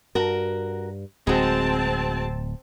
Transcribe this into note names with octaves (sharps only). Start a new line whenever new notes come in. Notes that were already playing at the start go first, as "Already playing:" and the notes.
G2 F#4 A#4
D1 G#3 C4 F#4 A5